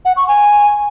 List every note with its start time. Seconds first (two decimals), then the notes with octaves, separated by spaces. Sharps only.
0.05 F#5
0.17 C#6
0.28 G#5